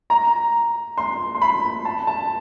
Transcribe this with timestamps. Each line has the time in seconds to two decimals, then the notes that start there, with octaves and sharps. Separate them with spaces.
0.10 A#5
0.98 C6
1.35 C6
1.42 B5
1.85 A5
2.07 A5